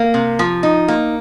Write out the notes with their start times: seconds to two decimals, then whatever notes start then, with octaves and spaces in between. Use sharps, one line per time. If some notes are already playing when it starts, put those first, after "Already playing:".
Already playing: A#3
0.14 C3
0.39 F3
0.63 D#4
0.88 A#3